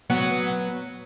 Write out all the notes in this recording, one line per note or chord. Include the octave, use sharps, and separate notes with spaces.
F#3 B3 F#4